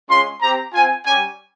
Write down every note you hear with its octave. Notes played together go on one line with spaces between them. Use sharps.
G#3 C#4 F4 C6
C4 G4 A#5
C4 F4 G#5
G3 C#4 G4 G#5